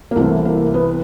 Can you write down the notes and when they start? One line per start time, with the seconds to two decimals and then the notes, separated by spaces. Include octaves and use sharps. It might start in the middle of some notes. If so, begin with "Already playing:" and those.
0.11 A#3
0.16 C2 C3 E3 A3
0.45 A#3
0.74 B3